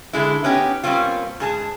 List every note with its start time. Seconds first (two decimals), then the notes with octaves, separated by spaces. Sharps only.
0.13 D3 G#3 E4
0.44 B3 C#4 D#4 G4
0.84 B2 G3 A#3 C4 C#4 F4
1.40 G#2 G#4 A5